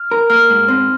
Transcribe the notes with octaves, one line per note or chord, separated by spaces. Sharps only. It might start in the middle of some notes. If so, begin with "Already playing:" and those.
Already playing: F6
A#4
A#3 F6
G#2
C4